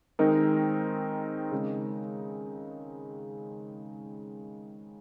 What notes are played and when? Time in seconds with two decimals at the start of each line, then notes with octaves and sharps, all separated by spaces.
0.19 D#3 G#3 C4 D#4 A#4
1.52 C#3 G#3 D#4